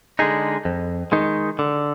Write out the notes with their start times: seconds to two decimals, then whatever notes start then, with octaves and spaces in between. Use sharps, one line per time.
0.19 D3 G#3 D#4 G#4
0.65 F2
1.12 D#3 G#3 D#4
1.59 D3